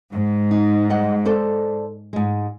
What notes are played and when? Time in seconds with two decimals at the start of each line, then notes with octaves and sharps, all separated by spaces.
0.12 G#2
0.51 D#4
0.90 G3 D#5 F#5
1.25 A4 C5 D5
2.13 G#2 G#3